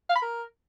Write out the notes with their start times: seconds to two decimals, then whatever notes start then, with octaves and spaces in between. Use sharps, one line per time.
0.09 F5
0.15 B5
0.22 A#4